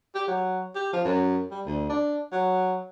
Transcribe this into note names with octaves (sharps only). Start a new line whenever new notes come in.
G4
F#3
G4
F3
F#2
G3
D2
D4
F#3